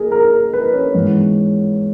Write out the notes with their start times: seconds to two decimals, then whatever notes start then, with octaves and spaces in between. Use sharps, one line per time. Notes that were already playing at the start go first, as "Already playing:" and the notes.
Already playing: A#3 G#4 A#4
0.12 A#4
0.32 A#4
0.53 B4
0.73 C#4
0.94 G#2 E3 G#3 B3